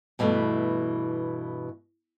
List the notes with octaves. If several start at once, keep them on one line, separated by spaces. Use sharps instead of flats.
G2 B2 E3 G#3 A3